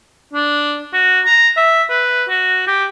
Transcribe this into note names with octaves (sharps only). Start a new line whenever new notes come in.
D4
F#4
A#5
E5
B4
F#4
G4